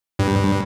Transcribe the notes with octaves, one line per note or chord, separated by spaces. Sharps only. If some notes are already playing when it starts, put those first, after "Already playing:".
G2